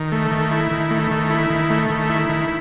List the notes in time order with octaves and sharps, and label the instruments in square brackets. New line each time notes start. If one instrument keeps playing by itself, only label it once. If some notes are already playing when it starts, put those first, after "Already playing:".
Already playing: [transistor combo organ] D#3
A3
D#3
E4
D#3
A3
D#3
E4
D#3
A3
D#3
E4
D#3